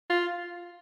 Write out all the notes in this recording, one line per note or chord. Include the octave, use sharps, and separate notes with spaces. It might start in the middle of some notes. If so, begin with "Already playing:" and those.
F4